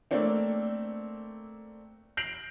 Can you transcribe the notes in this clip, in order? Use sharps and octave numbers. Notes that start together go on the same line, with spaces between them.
A3 A#3 C4 D4
G6 A#6 C7 D7 F7 F#7